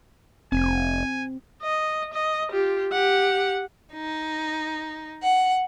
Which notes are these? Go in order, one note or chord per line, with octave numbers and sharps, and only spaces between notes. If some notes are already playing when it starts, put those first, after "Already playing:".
F1 C4 G#5
D#5
D#5
F4 G4
G4 F#5
D#4
F#5